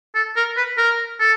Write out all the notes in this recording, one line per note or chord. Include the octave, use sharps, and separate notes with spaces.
A4
A#4
B4
A#4
A4